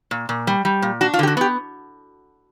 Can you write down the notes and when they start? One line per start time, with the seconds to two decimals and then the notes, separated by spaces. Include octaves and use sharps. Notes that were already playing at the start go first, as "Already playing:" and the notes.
0.11 A#2
0.29 A#2
0.47 G3
0.65 G3
0.82 A#2
1.01 D4 F#4
1.14 F4
1.19 D3 G4
1.27 F#4
1.37 B3 G4